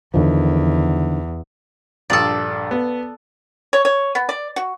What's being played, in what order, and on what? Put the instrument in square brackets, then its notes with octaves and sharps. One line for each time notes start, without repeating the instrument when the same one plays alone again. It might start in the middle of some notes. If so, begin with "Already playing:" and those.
[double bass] E2 [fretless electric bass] D3 D#3 F3
[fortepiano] A#1 G2 D#6 [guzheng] A4 D5
[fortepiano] B3
[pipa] C#5
C#5
B3
D5
F#4